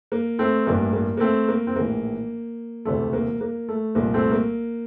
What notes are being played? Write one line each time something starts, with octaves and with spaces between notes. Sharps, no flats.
A#3
A3 C4
A1 G2 E3 A#3
A#3
A#3
A3 C4
A#3
C4
A#1 A2 E3 A#3
E1 D2 C3 E3 A3
A#3
A#3
A3
C2 A#2 A#3
A3 C4
A#3